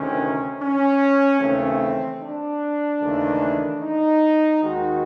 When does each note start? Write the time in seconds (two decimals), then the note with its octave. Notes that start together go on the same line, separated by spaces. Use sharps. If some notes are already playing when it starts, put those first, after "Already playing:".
Already playing: D2 C3 D#3 C#4
0.60 C#4
1.39 D#2 C#3 E3 A3 C4
2.20 D4
3.01 D#2 C#3 E3 A3
3.81 D#4
4.62 D#2 D#3 G#3 F#4